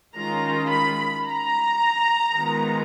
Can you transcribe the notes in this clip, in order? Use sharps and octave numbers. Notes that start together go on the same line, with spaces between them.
D#3 G#3 C#4 F4 A#5
B5
A#5
D#3 G#3 B3 F4